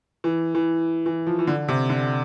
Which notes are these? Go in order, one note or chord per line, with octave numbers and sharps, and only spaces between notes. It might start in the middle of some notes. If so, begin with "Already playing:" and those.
E3
E3
E3
F3
E3
D3
C3
D3